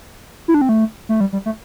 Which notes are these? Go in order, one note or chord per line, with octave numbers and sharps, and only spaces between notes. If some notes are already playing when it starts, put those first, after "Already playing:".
E4
D4
C4
A3
A3
G3
G3
A3